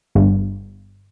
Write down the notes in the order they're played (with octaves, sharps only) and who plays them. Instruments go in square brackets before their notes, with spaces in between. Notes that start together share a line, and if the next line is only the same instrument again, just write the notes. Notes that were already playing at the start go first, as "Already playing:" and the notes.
[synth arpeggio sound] G1